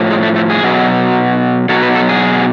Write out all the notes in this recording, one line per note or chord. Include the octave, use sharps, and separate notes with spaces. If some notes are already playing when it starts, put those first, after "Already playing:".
Already playing: A2 F3
G#3
A3
A3
G#4
B2 F#3
B2 F#3 A4
B4
A4
G#4